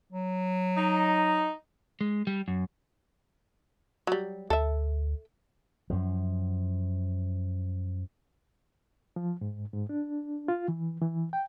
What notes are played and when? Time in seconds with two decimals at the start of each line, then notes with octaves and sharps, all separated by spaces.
0.12 F#3
0.77 D#4
2.01 G#3
2.27 G3
2.48 F#2
4.07 F#3 G3
4.50 D2 A4 E5
5.90 F#2 F3
9.16 F3
9.41 G#2
9.73 G#2
9.89 D4
10.48 F4
10.68 E3
11.02 E3
11.33 G5